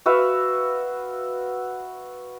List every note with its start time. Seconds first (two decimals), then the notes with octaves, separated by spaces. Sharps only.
0.06 F#4 B4 E5 F5